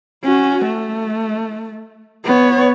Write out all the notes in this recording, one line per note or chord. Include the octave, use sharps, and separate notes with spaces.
C#4 F#4
A3
B3 C#5